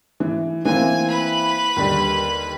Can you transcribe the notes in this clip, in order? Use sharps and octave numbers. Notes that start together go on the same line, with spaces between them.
E3
E3 A#3 C4 G#5
B4 B5
D#2 D3 G3